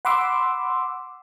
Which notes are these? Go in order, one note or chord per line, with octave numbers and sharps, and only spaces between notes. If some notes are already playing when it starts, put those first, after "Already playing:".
F#5 B5 C6 D6 E6